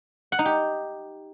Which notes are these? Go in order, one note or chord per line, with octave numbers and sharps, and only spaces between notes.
F#5
D#4
G4